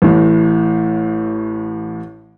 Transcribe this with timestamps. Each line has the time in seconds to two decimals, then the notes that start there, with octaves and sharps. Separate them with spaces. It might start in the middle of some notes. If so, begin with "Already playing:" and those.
0.02 A1 A2